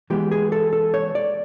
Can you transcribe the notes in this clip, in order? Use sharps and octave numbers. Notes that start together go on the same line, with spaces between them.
E3 G#3 B3 G4
G#4
A4
A4
C#5
D5